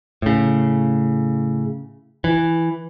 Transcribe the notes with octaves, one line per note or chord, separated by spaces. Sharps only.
A2 C#3
E3